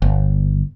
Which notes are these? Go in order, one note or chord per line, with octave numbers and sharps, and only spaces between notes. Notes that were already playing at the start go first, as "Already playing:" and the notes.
G1